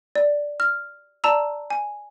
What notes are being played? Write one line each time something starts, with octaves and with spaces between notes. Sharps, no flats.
D5
F6
D5 A5 A#5 E6
G#5